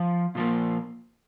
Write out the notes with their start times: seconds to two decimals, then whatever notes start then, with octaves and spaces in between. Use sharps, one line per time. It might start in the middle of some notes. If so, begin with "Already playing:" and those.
Already playing: F3
0.35 A#2 F3 A#3